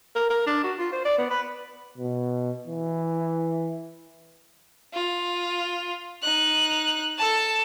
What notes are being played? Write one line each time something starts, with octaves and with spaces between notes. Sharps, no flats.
A#4
A#4
D4
F#4
F4
C5
D5
B3
B4
B2
E3
F4
D#4 F#6
A4 A5